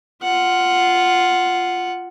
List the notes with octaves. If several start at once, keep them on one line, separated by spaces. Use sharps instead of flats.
F4 F#5